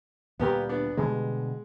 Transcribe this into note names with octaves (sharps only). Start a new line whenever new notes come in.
D2 A#2 G3 B3 G4 A#4
B3 D4
B2 D3 G3 G#3